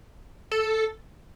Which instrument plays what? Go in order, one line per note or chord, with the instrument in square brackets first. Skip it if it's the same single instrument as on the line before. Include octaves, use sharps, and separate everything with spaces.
[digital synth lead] A4